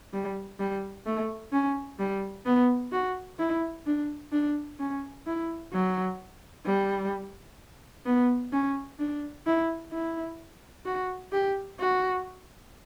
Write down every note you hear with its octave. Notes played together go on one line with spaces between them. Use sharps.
G3
G3
A3
C#4
G3
B3
F#4
E4
D4
D4
C#4
E4
F#3
G3
B3
C#4
D4
E4
E4
F#4
G4
F#4